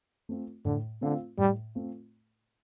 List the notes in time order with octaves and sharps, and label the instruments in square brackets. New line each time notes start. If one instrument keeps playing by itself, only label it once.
[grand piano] A3 C4 F4
[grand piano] A2 [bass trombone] D3
[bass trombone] D3 [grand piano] A3 C4 F4
[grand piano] A2 [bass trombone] G3
[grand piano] A3 C4 F4